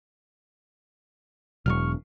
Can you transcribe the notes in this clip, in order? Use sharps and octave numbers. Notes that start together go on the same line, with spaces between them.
E1 B2 F#3 G#3 C#6 F6